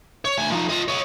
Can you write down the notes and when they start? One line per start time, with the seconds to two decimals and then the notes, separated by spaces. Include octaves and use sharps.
0.25 C#5
0.38 D2 G#5
0.51 F3 D#4
0.69 F4 D#5
0.88 C#5 D#5